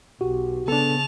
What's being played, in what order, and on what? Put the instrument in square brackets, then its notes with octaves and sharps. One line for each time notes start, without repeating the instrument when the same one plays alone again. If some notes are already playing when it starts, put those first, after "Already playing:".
[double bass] B1 [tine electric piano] F#4 G4
[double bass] C#3 [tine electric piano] B3 [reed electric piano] D4 A4 [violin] A5 F7